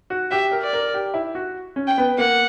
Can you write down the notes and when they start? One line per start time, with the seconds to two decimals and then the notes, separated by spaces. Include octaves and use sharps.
0.10 F#4
0.31 G4 E5
0.51 A#4
0.62 D5
0.73 A#4
0.94 G4
1.14 E4
1.35 F#4
1.76 C#4
1.87 G5
1.98 B3
2.18 A#3 F#5